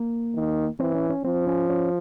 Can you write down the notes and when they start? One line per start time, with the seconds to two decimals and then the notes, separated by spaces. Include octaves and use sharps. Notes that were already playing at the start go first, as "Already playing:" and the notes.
Already playing: A#3
0.35 D#3
0.80 E3 C4
0.95 C#4
1.10 C#4
1.24 F3 C4
1.47 C#4
1.70 C#4